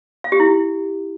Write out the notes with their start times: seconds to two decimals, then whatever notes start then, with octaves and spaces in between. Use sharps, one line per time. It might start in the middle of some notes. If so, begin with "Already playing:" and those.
0.24 F5
0.32 G4
0.40 E4